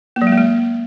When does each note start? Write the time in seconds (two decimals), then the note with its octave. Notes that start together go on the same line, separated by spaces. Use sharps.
0.16 A#3
0.22 F#3
0.27 G#3
0.32 A#3
0.38 G#3